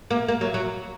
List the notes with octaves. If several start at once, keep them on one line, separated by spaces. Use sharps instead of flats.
A#3
A#3
F#3
F#3